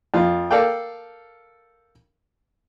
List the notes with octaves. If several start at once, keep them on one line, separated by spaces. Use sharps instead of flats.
F2 F4
A4 A#4 D5 F5 G5